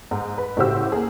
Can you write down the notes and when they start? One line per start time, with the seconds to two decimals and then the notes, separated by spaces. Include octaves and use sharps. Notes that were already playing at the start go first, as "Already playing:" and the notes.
0.11 G#2
0.38 B4
0.57 A2 C#3 F#4 G4 C5 E6
0.92 A#3 G#4